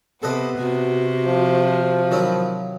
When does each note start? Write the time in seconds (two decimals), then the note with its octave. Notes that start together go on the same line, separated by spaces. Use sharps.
0.23 C3 B3 A4 B4 D#5
0.59 C3 F#4
1.25 F3
2.11 D#3 F#3 E4